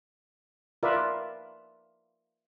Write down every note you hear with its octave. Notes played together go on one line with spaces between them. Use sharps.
F4 A#4 B4 D5 E5